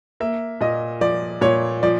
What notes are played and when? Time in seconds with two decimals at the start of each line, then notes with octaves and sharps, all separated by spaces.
0.20 A#3 E5
0.61 A#2 D#5
1.01 F3 D5
1.41 A#2 C#5
1.83 F3 D5